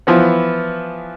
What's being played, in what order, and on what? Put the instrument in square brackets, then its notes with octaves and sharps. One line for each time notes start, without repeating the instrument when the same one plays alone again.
[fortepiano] E3 F3 B3